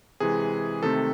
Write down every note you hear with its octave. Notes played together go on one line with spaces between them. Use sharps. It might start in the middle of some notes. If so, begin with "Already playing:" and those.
C3 E3 G#3 G#4
C3 D#3 A3 C4 A4